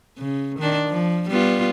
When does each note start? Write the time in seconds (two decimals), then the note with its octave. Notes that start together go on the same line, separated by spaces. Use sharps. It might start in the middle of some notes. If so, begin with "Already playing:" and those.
0.18 C#3
0.59 D#3 D4
0.89 F3
1.30 G3 B3 F4